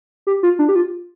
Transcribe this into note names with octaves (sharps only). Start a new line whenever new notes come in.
G4
F4
D4
G4
F4